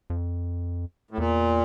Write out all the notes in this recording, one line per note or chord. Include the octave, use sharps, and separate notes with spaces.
F2
A2
E2 A#2